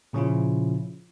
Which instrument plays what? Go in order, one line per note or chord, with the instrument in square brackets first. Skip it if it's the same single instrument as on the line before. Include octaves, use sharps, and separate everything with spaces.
[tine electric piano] A#2 C#3 F3 C#4 E4 F4